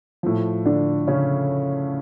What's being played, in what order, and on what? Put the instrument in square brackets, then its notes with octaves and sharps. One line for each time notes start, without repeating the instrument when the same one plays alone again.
[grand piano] A2 F3
D3 D4
C#3 C#4